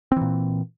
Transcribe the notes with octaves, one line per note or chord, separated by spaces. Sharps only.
A#2 E3 C4